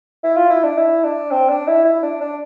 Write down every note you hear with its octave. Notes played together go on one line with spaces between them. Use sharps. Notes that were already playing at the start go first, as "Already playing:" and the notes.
E4
F4
E4
D4
E4
D4
C4
D4
E4
E4
D4
D4